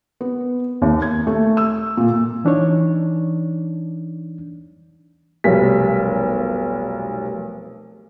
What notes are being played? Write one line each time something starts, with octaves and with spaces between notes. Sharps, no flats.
B3
D#2
G#6
A3
E6
A#2
E3 D4 D#4 C#5
F1 B1 G3 A#4 B6